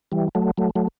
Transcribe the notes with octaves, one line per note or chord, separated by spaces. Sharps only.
E3 G3
F#3 A3
F#3 A3
F#3 A3